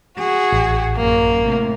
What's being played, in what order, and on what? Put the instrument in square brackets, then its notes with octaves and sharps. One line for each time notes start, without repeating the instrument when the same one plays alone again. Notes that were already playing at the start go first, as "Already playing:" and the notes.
[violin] F#4 [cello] G#4
[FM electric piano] A1
[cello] F#2 F#3 [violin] A#3
[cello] A2 C3